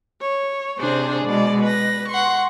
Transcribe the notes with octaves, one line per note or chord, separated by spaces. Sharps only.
C#5
C3 C4 D4 G#4 C5
B2 G#3 D5
B4 A#6
F#5 C6 C#6